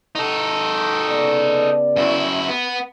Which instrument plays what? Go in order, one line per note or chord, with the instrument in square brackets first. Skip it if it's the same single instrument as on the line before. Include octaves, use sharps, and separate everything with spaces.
[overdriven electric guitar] D#4 A4
[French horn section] C#3 B3 D5
[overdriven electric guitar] F#2 E4
B3